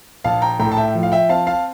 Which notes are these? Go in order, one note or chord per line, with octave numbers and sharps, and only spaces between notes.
A#1 F5 A5
G5 A#5
A2 G5 A#5
A5
E5 G5
F3
F5
E5 G5
C4 F5 A5
F5 A5